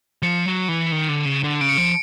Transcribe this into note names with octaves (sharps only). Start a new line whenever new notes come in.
F3 C#7
F#3
E3
D#3
D3
C#3
D3
C#3 D7
C#7
F3 D7